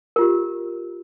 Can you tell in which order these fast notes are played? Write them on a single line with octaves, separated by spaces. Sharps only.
A#4 F4 G4